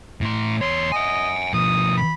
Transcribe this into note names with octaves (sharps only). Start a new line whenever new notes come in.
A2 C6
E2 C#5 C6
D#5 F#5 G#5
B2 F3 D#6
B5